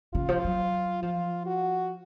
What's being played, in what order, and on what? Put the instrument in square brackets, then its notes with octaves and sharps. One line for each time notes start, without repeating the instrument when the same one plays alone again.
[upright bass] C#3 [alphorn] F4
[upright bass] F3
F#3
[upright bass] F3 [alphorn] F4
[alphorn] F#4